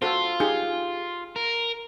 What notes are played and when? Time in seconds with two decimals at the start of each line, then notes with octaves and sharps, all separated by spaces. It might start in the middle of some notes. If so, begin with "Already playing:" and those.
0.02 F4 F#4 A4 C5
0.40 D#4 G4 G#4
1.36 A#4